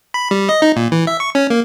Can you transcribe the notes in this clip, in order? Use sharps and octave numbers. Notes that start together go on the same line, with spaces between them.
B5
G3
D#5
D#4
A#2
E3
E5
C#6
C#4
A#3